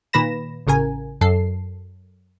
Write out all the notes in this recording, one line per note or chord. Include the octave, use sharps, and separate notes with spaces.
A#2 D#3 B4 B5 A#6 E7
A1 C#3 A#4 G#5
F#2 A4 C7